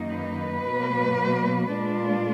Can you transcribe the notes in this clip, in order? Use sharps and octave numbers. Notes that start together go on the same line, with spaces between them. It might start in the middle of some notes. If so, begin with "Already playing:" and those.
Already playing: F#2 D#3 A#3 D#4
B4
B2 F#3 A#3
A#2 G#3 D4 F4